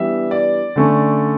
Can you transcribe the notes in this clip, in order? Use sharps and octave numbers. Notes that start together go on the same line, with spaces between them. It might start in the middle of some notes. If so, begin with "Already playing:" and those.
Already playing: E3 G3 B3 D4 E5
D5
D3 A3 C#4